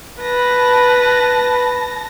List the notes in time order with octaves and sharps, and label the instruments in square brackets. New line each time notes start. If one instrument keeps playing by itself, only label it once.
[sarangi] B4 [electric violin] A5 A#6